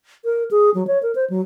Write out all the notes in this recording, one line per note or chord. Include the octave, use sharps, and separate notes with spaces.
A#4
G#4
F#3
C#5
A#4
C5
F#3